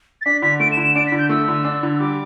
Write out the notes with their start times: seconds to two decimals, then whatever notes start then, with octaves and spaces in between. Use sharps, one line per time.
0.21 A6
0.25 D4 B6
0.42 D3 B6
0.60 A3 D7
0.72 E7
0.77 D3
0.83 E7
0.95 D4 D7
1.07 B6
1.12 D3
1.18 G6
1.29 A3 E6
1.48 D3
1.64 D4
1.83 D3
1.95 E6
2.00 G3 D6